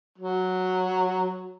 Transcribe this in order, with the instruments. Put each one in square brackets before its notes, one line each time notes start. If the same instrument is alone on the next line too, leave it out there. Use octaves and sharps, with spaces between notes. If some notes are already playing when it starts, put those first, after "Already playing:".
[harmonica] F#3